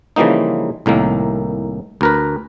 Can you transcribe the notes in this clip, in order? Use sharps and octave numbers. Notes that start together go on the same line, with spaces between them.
C#3 E3 F3 G3 A#3 D#4
C2 A2 D#3 A#3
D2 A#4 B4